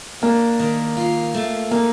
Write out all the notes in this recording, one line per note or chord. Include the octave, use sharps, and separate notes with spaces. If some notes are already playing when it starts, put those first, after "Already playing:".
A#3 D4
D#3
F4
A3
A#3 D#4